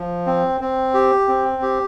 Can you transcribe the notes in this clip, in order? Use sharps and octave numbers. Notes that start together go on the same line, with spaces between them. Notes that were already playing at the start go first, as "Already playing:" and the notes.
Already playing: F3
C4
C4
G4
C4
G4